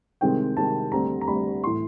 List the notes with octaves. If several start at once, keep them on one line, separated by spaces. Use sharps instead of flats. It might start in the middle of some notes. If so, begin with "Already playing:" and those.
C2 C3 D#3 G#3 C4 G5
C2 C3 D#3 G#3 C4 A5
D2 D3 G3 C4 A#5
A#5
D2 D3 G3 C4 B5
A2 E3 C6